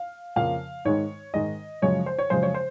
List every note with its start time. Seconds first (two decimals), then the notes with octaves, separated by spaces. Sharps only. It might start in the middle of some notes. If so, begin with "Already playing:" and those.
Already playing: F5
0.36 F2 C#3 F3 A#3 F5
0.85 G#2 D#3 G#3 C#5
1.34 G#2 D#3 G#3 D#5
1.82 F#2 C#3 F3 G#3 C#5
2.06 C5
2.19 C#5
2.30 F#2 C#3 F3 G#3 C5
2.43 C#5
2.54 C5